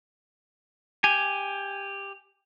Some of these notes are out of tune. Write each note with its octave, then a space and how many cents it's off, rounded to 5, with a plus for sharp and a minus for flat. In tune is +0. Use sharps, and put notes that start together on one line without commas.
G4 +15 G#5 +0